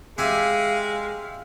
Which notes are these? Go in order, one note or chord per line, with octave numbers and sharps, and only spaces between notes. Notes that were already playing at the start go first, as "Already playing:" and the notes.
G#3 G4 E5 F5 G#5